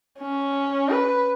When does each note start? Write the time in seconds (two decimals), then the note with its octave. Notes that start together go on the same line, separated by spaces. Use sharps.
0.20 C#4
0.90 B4